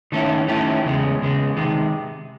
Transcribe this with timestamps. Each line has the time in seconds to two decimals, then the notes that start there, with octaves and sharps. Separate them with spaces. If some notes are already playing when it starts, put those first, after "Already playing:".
0.12 D#3 A3 C#4 E4
0.48 D#3 A3 C#4 E4
0.85 E2 C#3 G#3
1.20 E2 C#3 G#3
1.56 C3 D#3 G#3